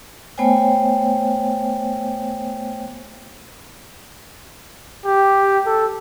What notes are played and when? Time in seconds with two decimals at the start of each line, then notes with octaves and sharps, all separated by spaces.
0.38 A3 B3 C5 C#5 G5 G#5
5.06 G4
5.66 A4